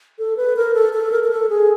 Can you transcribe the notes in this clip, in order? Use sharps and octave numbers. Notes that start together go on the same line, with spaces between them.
A4
B4
A#4
A4
A4
A#4
A#4
A4
G#4